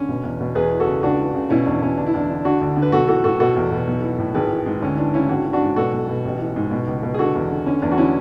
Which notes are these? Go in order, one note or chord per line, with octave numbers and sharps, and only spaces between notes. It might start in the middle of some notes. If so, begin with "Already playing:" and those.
Already playing: D3 C#4
B2
E2
B2
E2 G#4 B4
E3
F#4 A4
C#3
C#2 D4 F#4
E3
C#3
B2 C#4 E4
E2 D4
B2 C#4
D3 D4
E4
E2 D4
D3
D3 D4 F#4
D2
D3
B4
B1 F#4 A4
E3 F#4 A4
A2 F#4 A4
B2 F#4 A4
E2
B2
B1
E3
A2
G#1 G#4 B4
E3
G#2
D2 C#4
E3 D4
C#3 C#4 E4
G#1 D4 F#4
E3
D4 F#4
G#2
B2 F#4 A4
B1
B2
A1
E3
G#2
B2
C#2
B2
G#4
D3 F#4 A4
E2
D3
D3 C#4
E2 D4
F#4
D3 C#4 E4